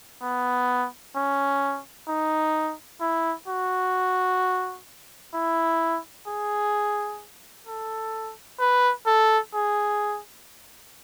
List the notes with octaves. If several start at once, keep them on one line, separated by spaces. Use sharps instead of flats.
B3
C#4
D#4
E4
F#4
E4
G#4
A4
B4
A4
G#4